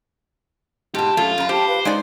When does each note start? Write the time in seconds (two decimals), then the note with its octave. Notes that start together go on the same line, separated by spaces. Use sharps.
0.95 G#2 B2 G4 A5
1.17 F#2 A3 F4
1.38 F#2 A#5 B5
1.49 G4 C5 G5 A5 B5
1.67 B4 F5 B5
1.85 G#3 D#4 D5 F5